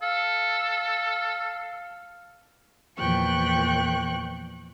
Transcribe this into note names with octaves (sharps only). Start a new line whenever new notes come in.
A4 F5
E2 A#2 F3 G5 C#6 F#6